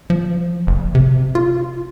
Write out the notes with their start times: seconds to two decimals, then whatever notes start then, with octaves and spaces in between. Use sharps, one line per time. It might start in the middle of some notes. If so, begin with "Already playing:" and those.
0.10 F3
0.67 F#1
0.95 C3
1.35 F4